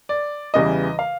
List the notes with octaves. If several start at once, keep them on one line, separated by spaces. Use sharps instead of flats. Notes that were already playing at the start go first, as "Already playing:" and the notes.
D5
E2 C#3 E3 G3 D#5
F5